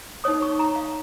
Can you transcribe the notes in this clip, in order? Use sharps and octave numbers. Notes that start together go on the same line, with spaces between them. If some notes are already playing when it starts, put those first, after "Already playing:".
D#4 C#5 D#6
C#6
A#5
F5